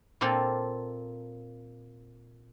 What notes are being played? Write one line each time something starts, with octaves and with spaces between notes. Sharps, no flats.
A#2 A#3 C4 F4 A4